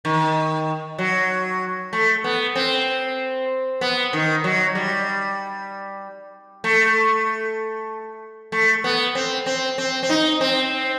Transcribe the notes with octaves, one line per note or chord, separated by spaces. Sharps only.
D#3
F#3
A3
B3
C4
B3
D#3
F#3
G3
A3
A3
B3
C4
C4
C4
C4
D#4
C4